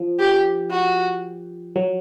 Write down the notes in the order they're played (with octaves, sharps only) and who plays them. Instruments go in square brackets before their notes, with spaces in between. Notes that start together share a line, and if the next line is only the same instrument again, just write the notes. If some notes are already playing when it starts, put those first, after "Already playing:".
Already playing: [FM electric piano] F3
[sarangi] G4
F#4
[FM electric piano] F#3